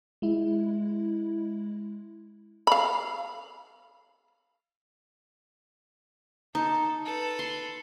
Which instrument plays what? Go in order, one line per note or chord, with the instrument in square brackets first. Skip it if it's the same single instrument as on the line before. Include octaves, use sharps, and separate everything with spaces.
[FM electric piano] G#3 E4
[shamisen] F5 B5
[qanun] D#4 [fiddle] A4
[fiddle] A4 B4
[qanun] C6